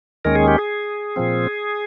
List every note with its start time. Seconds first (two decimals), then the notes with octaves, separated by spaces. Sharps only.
0.25 D#2 D#3 G#3 C#4 A#4
0.35 G#4
0.48 G4
0.58 G#4
1.16 A#2 F3 C4